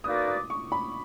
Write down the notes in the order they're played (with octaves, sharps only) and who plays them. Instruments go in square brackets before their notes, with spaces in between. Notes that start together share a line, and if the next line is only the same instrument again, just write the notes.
[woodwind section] A#3 D#4 F#4 B4 D5 [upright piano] D#6
[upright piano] D6
C#6
B5